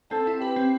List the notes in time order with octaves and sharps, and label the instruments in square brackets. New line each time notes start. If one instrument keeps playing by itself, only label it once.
[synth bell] C4 [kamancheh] A4
[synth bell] E4
[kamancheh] G4 [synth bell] B4
[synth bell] C4